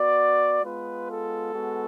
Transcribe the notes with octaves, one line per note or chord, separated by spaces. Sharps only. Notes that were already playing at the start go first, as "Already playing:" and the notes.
Already playing: B3 F#4 D5
G#3 B3 F4 B4
A4
G#3 B3 F#4